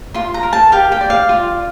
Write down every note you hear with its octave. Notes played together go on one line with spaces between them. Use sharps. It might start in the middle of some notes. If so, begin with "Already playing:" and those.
F4 C6
A#5
A#4
A5
G4 F5
G5
D5
F5
F4